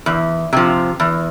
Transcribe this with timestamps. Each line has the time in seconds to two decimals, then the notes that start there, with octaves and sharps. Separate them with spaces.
0.06 E2
0.53 C3 F3
1.00 E2